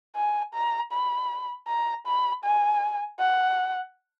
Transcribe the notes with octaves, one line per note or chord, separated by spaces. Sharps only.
G#5
A#5
B5
A#5
B5
G#5
F#5